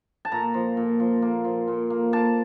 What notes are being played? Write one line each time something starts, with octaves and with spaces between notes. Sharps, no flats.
A5
A#2 A#5
F3
A#2
F3
A#3
F3
A#2
A#3
A#3 A5